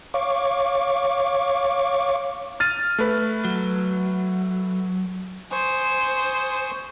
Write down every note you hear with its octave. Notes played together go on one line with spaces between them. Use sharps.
C#5 F5 C#6 D6
F6 A6 D#7
A3 B4
F#3
C5 G#5 C#6 D#6